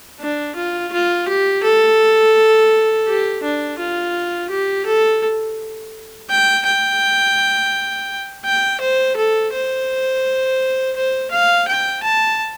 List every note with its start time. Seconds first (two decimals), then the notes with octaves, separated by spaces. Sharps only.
0.20 D4
0.56 F4
0.93 F4
1.29 G4
1.63 A4
3.08 G4
3.43 D4
3.79 F4
4.50 G4
4.86 A4
6.30 G5
6.66 G5
8.45 G5
8.81 C5
9.16 A4
9.53 C5
10.96 C5
11.31 F5
11.68 G5
12.03 A5